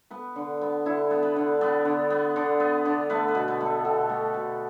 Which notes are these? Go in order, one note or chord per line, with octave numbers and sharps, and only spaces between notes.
B3 B4
D3
B3
D3 E4
B3
B4
D3
B3 D5
D3
B3
D3
B3
D3
A3 B4
B4
B2
B4
A3
A4
B2 G4
A3
B2